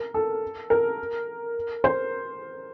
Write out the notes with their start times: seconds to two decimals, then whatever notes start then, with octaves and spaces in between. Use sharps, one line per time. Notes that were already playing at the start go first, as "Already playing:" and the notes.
Already playing: A#4
0.14 A4
0.70 A#4
1.84 C5